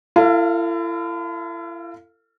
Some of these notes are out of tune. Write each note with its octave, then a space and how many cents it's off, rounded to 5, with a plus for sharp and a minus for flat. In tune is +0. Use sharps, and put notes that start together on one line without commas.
E4 +40 A4 +35 F5 +0